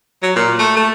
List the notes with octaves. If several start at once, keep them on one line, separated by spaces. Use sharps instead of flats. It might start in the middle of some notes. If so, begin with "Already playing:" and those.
F#3
A#2
A3
A3